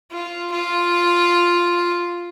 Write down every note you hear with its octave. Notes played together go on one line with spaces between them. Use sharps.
F4
F4